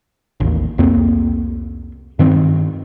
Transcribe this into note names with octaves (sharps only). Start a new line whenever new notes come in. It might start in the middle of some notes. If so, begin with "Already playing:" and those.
A1 D#2
C2 F2 A#3 C4
G2 D#3 C4